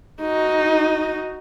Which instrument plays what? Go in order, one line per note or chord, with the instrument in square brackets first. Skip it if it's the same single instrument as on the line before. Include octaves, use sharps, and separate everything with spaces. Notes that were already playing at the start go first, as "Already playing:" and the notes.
[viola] D#4 F#4